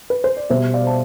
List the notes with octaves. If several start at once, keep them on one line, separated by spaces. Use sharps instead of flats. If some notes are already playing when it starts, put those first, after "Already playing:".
B4
C5
D5
B2 G3 C5 E5
D5 F5
A5